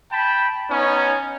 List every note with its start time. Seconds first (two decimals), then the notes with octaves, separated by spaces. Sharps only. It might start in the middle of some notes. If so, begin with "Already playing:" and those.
0.12 G5 A5 B5
0.71 B3 C#4 D#4 C#5